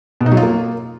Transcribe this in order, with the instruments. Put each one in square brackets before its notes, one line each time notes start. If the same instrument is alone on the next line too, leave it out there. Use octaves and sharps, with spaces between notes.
[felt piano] B2
D#4
F#3
F4
A#3